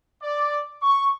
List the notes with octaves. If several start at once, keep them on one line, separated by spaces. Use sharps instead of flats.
D5
C#6